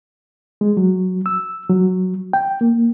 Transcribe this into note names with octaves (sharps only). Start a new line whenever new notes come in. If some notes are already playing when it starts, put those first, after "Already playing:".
G#3
F#3
E6
F#3
G5
A#3